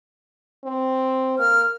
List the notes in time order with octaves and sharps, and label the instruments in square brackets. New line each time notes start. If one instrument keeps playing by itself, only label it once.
[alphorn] C4
[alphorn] A#3 [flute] F6